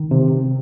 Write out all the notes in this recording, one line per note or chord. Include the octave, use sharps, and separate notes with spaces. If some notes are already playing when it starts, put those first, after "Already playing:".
Already playing: D#3
C3